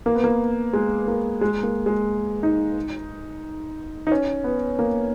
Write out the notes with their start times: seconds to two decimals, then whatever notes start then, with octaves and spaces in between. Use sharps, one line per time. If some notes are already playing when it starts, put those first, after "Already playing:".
0.06 A#3
0.15 B3
0.24 A#3
0.73 G#3
1.08 A#3
1.41 G#3
1.63 A#3
1.86 G#3
2.43 D#4
4.07 D#4
4.12 C#4
4.44 B3
4.79 A#3